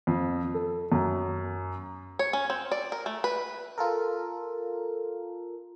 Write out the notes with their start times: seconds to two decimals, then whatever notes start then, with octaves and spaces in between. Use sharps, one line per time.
0.07 F2
0.54 A4
0.92 F#2
2.19 C#5
2.33 C#4
2.50 C4
2.72 D5
2.92 A#4
3.06 A3
3.24 B4
3.78 F4 A4 A#4